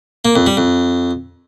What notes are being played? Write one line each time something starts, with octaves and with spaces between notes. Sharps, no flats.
A#3
F2
G3
F2